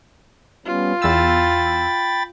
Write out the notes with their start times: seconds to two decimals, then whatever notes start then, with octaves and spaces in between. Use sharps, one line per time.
0.66 G3 B3 C#4 F4
1.02 E2 G5 B5 E6 A6